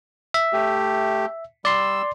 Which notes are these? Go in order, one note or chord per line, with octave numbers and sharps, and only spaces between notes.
E5
A3 G4
G3 D5 C6 E6